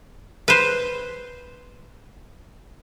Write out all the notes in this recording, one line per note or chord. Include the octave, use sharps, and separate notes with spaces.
B4 C5